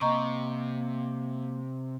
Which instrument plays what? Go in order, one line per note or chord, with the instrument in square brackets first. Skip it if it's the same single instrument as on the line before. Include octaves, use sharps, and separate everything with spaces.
[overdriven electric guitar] C3 [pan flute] A#3 [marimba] D#5 A#5 C#6